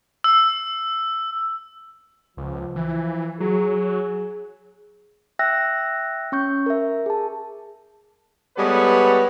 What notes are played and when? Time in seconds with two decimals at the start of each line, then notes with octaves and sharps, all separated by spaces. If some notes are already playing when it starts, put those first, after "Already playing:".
0.24 E6
2.37 C#2 F3
2.76 E3
3.40 F#3 G#4
5.39 E5 G5 E6 F#6 A#6
6.32 C#4 C#6 G6
6.66 A#4 E5
7.06 G#4 A5
8.57 G3 G#3 B3 A4 B4 C#5